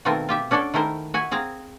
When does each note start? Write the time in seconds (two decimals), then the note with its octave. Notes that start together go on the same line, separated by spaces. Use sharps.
0.05 B2 D#3 A3 C4 F4 A#4
0.29 F4 G4 E5
0.51 C#4 D4 F#4 A4 D5
0.74 D#3 A3 E4 A#4 C5
1.14 F#4 E5 G#5
1.31 C4 G#4 F5 A#5